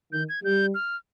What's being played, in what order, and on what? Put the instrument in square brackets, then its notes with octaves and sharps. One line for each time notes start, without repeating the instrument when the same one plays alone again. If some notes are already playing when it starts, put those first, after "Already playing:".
[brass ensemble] D#3 [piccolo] G6
[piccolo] G#6
[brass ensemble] G3 [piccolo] G6
[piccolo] F6